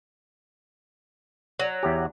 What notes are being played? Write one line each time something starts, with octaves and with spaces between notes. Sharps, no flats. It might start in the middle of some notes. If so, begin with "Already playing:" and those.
F#3
E2 G4